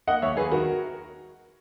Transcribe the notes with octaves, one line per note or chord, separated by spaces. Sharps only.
A#3 D#5 F#5
D#2 C#5 E5
D#2 G#4 B4
D#3 F#4 A#4